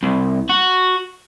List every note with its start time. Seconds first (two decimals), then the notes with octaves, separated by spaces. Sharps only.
0.03 C2
0.50 F#4